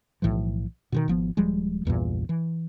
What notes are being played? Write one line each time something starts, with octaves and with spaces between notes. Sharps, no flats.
B1 A2 E3 F3
B2 D3 D#3
G#1 F3 B3
D#1 F3 G3 G#3
A#1 E2 G2 A#2
E3